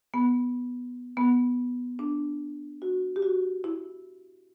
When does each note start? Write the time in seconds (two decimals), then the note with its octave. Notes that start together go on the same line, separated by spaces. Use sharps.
0.14 B3
1.17 B3
1.99 D4
2.82 F#4
3.16 G4
3.22 F#4
3.64 E4